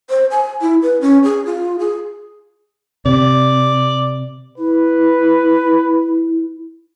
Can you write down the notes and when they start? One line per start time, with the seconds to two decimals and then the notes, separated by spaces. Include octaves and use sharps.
0.10 C5
0.31 G#5
0.61 E4
0.82 B4
1.01 C#4
1.24 G#4
1.46 F4
1.79 G#4
3.06 C3 D5
4.58 E4 B4